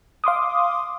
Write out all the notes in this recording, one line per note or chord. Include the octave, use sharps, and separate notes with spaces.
F5 C6 D6 D#6